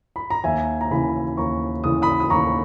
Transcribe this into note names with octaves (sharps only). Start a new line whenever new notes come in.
B5
A#5
D#2 E5 G#5
A#5
C#3 E3 G#5 B5
D#2 A#5 C#6
C#3 E3 D#6
B5 D#6
D#6
D#2 A#5 C#6